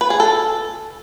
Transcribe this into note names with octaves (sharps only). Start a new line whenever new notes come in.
B4
G#4
A4